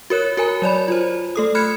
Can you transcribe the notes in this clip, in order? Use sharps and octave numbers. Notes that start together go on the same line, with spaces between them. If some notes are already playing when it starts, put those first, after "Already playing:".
F#4 A#4 C#5 F#6
F#4 A#4 G#5 A#5
F#3 C#5 D5 B5
F4 C5
A3 A4 D#6
B5 F6 F#6 G#6 C#7